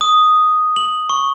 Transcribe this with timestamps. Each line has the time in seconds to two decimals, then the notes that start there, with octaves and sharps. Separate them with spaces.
0.01 D#6
0.76 F#7
1.09 C#6